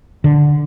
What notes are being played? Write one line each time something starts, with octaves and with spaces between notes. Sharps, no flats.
D3